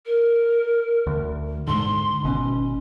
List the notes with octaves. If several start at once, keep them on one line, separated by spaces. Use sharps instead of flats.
A#4
D2
G#2 D3 C6
G#1 B2 C#4